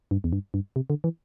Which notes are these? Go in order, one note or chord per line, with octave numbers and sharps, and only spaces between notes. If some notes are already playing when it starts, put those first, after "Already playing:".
G2
E2
G2
G2
C3
D3
E3